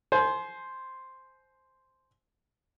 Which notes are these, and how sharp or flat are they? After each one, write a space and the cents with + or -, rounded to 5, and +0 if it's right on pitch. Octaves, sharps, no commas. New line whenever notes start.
C5 +0 G#5 +40